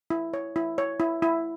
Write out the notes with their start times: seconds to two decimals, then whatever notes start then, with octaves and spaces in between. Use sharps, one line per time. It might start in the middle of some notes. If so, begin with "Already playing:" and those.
0.10 E4
0.34 C#5
0.56 E4
0.78 C#5
1.00 E4
1.22 E4